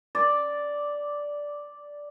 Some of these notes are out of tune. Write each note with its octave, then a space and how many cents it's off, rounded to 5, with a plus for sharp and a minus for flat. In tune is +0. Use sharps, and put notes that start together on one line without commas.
D5 -5